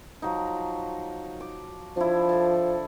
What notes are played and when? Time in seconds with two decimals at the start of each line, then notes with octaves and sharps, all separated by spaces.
0.22 F3 F#3 D#4
1.40 D6
1.97 F3 D4 E4
2.29 A4 A5